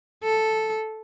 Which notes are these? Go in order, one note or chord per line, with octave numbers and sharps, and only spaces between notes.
A4